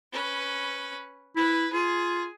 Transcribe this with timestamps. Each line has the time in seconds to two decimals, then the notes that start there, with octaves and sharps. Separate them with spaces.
0.13 C#4 B4
1.36 E4 B4
1.73 F4 G#4